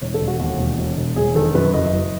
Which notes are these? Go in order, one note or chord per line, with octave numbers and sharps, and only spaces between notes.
E1 C#5
A4
E1
F#4
D#2
E1
E1
E1
E1 G#4
D#3 A4
F#2 B4
F#1 D#5
F#1